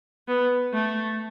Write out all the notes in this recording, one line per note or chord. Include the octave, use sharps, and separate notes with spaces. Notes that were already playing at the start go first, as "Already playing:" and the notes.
B3
A3